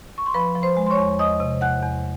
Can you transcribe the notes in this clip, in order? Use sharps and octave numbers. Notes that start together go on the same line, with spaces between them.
C#6
C6
F3 B4 B5
F3
C5 C6
G#3
C6
C#5 C#6
E2
E2 D#5 D#6
C3
E2 F#5 F#6
E2